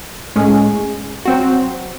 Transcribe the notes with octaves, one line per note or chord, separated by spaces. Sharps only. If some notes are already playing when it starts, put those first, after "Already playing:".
A2 G#3 C#4 G#4
F#3 C4 F#4